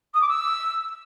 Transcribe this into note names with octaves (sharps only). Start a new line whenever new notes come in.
D#6
D6
E6